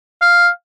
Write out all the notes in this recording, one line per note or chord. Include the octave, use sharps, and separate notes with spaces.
F5